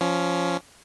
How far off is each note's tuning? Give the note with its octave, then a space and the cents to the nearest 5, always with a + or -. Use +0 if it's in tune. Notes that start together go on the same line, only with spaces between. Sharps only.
F3 +0 C#4 +10